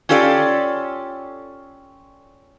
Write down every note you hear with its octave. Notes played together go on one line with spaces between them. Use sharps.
C#4 F4 G4 A4 D5